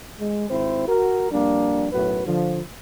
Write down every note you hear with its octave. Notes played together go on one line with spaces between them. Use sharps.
G#3
G#1 C4 E4 C5
F#4 A#4
F2 G3 A#3 D4
B1 F#2 A2 F#4 B4
D3 F3